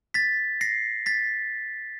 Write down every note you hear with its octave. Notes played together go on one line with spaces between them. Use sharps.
A6 B6
A#6 C7
A6 B6